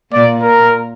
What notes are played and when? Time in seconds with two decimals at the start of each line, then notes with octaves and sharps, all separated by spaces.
0.13 A#2 D5
0.42 A#4